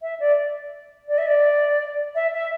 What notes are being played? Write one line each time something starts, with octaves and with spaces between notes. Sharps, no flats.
E5
D5
D5
E5
D5
E5
E5